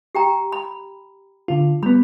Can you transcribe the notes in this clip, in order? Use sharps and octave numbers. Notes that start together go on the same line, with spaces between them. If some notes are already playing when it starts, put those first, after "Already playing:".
G4 G5 A#5
B5
D3 F4
G3 B3 B5